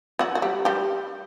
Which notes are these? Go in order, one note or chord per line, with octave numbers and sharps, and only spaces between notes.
F#3 F#4
F#4
G3 G4
G3 G4